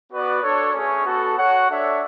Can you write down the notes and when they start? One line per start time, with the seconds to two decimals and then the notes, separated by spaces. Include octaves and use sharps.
0.11 B3 F#4 B4 D5
0.42 D4 A4 C#5
0.73 A3 C#4 G#4 C#5
1.04 B3 F#4 A4
1.37 F#4 C#5 F#5
1.68 D4 A4 C#5 E5